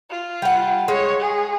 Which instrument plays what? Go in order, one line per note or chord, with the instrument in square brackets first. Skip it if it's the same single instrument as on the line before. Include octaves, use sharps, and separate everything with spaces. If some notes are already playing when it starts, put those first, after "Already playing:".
[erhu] F4
[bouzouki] G3 F#5
[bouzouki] G#3 [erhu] C#5
[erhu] G#4